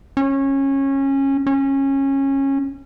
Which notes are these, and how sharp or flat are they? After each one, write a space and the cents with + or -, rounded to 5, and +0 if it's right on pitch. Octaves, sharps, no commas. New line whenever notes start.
C#4 -20
C#4 -20